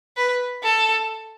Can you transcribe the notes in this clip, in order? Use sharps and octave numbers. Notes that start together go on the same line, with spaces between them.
B4
A4